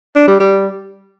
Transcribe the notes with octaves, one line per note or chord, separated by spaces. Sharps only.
D4
G3
G3